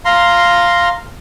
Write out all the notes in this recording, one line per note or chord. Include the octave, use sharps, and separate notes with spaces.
F5 A#5 C6